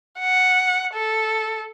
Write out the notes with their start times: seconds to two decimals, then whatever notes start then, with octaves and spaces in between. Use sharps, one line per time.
0.19 F#5
0.93 A4